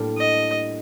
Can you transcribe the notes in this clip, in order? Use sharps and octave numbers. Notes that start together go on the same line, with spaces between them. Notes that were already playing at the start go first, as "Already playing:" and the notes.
Already playing: A2 G3 A#3 D4
D#5